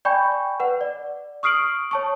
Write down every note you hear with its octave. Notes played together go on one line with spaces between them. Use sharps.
D5 G5 G#5 B5 C#6 G6
B4 F#5
D5
C#6 D#6 F6 C7 D7 F#7
C#5 A5 C#6